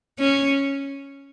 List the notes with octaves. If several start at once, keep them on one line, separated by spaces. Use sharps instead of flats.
C#4